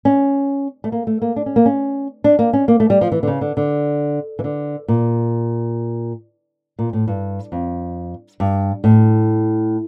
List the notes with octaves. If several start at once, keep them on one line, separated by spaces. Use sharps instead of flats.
C#4
A3
A#3
A3
A#3
D4
C#4
A#3
C#4
D4
A#3
C#4
A#3
A3
G3
F3
E3
D3
C#3
D3
D3
E3
D3
A#2
A#2
A2
G2
F2
G2
A2